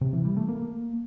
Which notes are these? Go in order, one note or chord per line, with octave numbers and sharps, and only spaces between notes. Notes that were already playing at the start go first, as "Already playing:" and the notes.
C3
E3
G3
A3
A#3